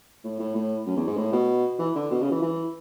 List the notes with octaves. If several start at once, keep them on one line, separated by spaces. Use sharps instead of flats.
A2
A2
A2
F#2
E2
G#2
A2
B2
E3
D3
B2
C#3
E3
E3